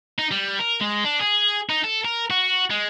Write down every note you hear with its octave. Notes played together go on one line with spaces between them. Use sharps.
D#4
G3
A#4
G#3
D4
G#4
D#4
A4
A#4
F#4
G#3